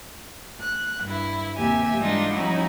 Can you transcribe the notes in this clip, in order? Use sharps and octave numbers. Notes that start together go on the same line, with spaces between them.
F#6
G2 E4
D#2 C3 G4 E5 G#5
G#2 E3 G3 D4 D#4 F4
F3 G3 C#4 D#4 E4 F#4